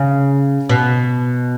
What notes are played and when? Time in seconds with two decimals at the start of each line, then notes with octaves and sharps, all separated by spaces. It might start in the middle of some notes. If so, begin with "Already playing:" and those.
Already playing: C#3
0.69 B2